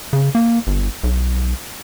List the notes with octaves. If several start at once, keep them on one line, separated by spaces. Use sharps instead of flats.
C#3
A#3
G1
B1